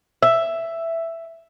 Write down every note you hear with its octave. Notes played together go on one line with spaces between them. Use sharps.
E5